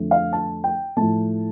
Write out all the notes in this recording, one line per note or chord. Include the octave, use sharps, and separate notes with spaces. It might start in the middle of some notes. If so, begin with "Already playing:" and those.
Already playing: F2 D3 A3
F5
A5
G5
A2 F3 A3 A5